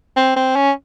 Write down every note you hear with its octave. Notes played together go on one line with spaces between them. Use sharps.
C4
C4
C#4